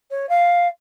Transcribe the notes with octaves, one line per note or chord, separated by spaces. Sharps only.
C#5
F5